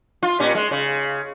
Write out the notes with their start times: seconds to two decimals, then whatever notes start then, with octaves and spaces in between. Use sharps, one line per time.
0.23 F4
0.40 A#2 C#4 G4
0.55 G#3
0.71 C#3